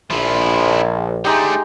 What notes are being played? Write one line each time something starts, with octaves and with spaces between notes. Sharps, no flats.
A#1 F3 E4
D3 G#3 A3 D#4 G4